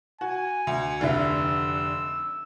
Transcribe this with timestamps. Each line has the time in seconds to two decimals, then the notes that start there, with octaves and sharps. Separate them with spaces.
0.21 F#4 G#5
0.67 D2
1.01 F1 D3 E5 E6